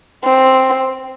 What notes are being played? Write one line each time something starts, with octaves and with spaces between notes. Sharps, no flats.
C4